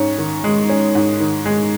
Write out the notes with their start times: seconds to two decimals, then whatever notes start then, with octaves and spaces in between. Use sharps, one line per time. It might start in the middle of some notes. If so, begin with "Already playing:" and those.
Already playing: G#2 C#4
0.18 D#3
0.44 G#3
0.69 C#4
0.95 G#2
1.20 D#3
1.45 G#3